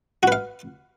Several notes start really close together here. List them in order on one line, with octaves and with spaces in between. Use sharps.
F#4 B4 F5